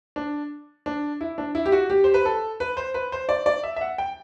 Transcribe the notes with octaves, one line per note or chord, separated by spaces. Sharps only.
D4
D4
E4
D4
E4
G4
F#4
G4
C5
B4
A4
B4
C5
B4
C5
D5
D5
E5
E5
F#5
G5